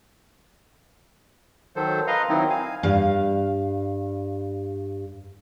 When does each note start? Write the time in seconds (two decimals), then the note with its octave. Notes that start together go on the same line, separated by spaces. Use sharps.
1.76 D#3 F#3 A4 C5
2.07 B4 D#5 F5 A#5 C6
2.29 D#3 F#3 C4 D#4 E4
2.50 F5 G#5
2.83 G2 F5